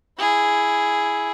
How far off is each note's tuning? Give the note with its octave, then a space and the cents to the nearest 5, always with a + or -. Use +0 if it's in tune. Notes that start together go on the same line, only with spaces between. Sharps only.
E4 +0 G#4 +0